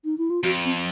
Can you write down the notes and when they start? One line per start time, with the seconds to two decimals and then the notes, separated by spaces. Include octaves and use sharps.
0.05 D#4
0.18 E4
0.30 F4
0.43 F2 F#4
0.64 C4